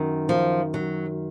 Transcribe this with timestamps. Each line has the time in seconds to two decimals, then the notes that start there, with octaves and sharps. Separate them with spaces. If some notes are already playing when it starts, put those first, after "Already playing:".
Already playing: F#2 D#3
0.29 F3
0.74 F#3